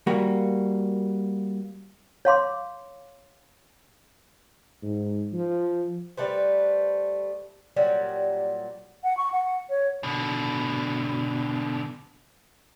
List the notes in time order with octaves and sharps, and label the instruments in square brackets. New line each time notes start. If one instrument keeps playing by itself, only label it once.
[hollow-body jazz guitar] G3 A#3 F#4
[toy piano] C#5 F5 C6 D6
[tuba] G#2
F3
[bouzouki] G3 A3 B4 C5
A#2 F#3 G3
[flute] F#5
C#6
F#5
C#5
[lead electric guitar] B2 D3